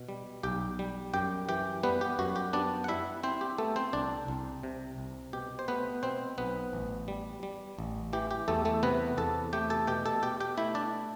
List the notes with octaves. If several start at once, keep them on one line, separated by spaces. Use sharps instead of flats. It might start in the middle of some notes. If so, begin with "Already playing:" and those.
Already playing: B2
G3
B1 G4 G5
G3
F#2 G4 G5
E3 G4 G5
G3 B3 B4
G4
F#2 F#4
G4
B3 D4 D5
F#5
G3 E4 E5
C4 E4 C5
G4
A3 B3 A4
C4 C5
C2 D4 D5
C2
C3
C2
B2 G4
C5
A3 B3 B4
B2 C4 C5
B1 B3 B4
A1
G3
G3
A1
E3 G4
G4
E2 A3 A4
A3 A4
C3 B3 B4
E2 A4 A5
A3 G4 G5
A4 A5
B2 G4 G5
A4 A5
B2 G4 G5
G4 G5
A3 E4 E5
D4 D5